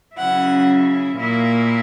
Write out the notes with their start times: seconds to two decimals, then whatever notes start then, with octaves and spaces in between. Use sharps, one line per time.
0.17 C#3 F#3 C#4 E4 F#5
1.16 A#2 A#3 E4